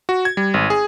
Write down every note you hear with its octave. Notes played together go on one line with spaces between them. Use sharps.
F#4
G#6
G3
G#1
G#4